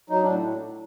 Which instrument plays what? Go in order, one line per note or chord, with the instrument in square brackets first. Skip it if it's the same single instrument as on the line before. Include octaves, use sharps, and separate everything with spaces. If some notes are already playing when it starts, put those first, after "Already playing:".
[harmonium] F#3 D#4
A2 D4